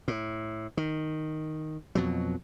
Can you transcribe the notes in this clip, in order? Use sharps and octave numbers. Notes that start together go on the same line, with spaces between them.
A2
D#3
F2 B2 F#3